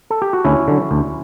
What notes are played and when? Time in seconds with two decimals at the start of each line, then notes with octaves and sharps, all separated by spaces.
0.10 A4
0.22 G4
0.33 F#4
0.45 D2 C#4 E4
0.68 D3 F#3
0.91 D2